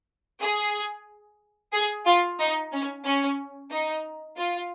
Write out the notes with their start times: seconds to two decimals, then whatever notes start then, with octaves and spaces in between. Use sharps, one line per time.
0.41 G#4
1.73 G#4
2.06 F4
2.39 D#4
2.73 C#4
3.05 C#4
3.71 D#4
4.38 F4